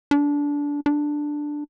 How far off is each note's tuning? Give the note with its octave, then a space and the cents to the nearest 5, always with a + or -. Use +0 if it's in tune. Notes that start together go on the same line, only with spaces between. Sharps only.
D4 -20
D4 +5